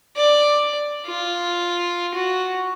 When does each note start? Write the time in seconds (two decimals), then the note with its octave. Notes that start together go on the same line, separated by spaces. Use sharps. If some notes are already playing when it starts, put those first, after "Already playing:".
0.16 D5
1.06 F4
2.14 F#4